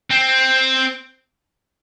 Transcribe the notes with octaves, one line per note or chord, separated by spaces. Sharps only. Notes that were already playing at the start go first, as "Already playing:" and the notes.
C4